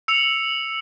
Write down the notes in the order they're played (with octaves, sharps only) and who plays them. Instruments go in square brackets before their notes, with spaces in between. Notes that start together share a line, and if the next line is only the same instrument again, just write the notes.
[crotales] E6 C#7 F7